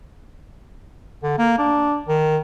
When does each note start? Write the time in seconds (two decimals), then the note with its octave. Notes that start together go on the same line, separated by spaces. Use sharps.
1.23 D3
1.38 A#3
1.58 D4
2.08 D#3